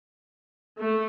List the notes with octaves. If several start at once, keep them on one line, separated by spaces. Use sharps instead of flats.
A3